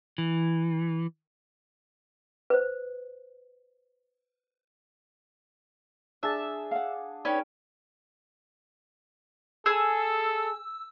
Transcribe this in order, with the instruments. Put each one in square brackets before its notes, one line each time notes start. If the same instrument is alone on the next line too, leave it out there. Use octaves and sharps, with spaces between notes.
[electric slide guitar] E3
[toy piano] B4 C5
[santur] D4 G#4 [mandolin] E5 A5
[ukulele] F5 F#5
[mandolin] C#4 B4 C#5 [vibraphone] D#4 D5 G5
[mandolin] G#4 [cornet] A4 [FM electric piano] E6